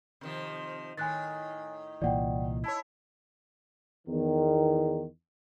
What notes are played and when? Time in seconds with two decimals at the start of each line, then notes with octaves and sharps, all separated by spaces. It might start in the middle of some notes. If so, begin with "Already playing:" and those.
0.21 C3 D#3 F3
0.97 A2 D#3 G#5 F#6 A6
2.02 C2 A#2 E3 D5 F#5 G5
2.64 E4 C#5 A5 G#6
4.08 E2 D#3